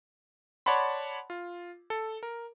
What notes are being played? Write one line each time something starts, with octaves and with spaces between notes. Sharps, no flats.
C#5 D5 F#5 A5 B5 C6
F4
A4
A#4